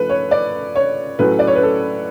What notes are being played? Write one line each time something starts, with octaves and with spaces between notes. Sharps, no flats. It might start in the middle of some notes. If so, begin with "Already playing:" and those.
Already playing: F3 A3 C#4 A4 B4
C#5
D5
C#5
A2 F#3 A3 C#4 B4
D5
C#5
B4
A4